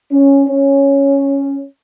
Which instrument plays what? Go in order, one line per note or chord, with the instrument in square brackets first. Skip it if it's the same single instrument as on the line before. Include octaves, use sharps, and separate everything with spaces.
[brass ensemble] C#4
C#4